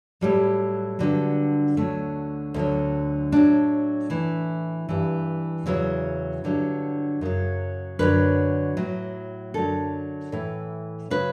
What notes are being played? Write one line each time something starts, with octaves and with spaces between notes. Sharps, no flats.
A2 F#3 G3
G2 D3 F#3
D2 D3 F#3 A3
D2 D3 F#3
A2 F#3 D4
A2 E3 E4
G2 E3
E2 C#3 F#3 E4
G2 D3 F#3
F#2 C#3 F#3
F#2 D3 F#3 B4
A2 F#3
F#2 D3 F#3 A4
A2 E3
C#3 F#3 B4